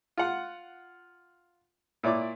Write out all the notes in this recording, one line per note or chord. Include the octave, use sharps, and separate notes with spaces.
F4 F#5
A#2 E4 C#5 D5 D6